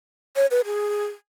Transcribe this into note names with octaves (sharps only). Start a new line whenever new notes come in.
C#5
B4
G#4